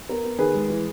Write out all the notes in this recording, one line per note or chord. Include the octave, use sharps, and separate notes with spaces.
B3 A#4
B3
D#3 G#4 B4
G#3
E3